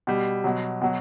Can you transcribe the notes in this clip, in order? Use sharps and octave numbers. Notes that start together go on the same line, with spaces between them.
B2 G3
B2 F#3
B2 F#3